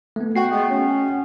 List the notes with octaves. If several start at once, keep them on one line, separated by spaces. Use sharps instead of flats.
A3 B3
F#4 F#5 G5 C7
G#3 A3 B3
C#4